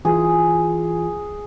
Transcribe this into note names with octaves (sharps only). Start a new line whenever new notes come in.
E3 F4 G#4